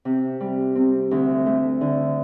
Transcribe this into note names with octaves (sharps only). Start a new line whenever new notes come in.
C3
G3
C4
D2
A3
D3